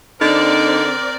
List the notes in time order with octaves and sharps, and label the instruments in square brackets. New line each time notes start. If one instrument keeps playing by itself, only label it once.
[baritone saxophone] D3 [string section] C4 D5 [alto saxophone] D#4 [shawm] A#4